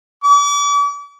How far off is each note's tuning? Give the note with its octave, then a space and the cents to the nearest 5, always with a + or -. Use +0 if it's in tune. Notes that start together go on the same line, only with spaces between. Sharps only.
D6 -40